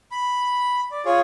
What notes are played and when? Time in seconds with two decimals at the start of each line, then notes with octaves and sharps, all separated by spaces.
0.12 B5
0.91 D5
1.05 F4 G#4 C#5